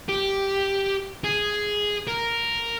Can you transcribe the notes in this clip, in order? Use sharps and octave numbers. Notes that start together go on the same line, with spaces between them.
G4
G#4
A#4